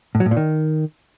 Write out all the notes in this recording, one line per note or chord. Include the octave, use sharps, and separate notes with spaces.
A2
F#3
A2
A#2
D#3